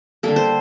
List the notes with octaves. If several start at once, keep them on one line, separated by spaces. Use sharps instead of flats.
D3 G3 A#3 A4
C5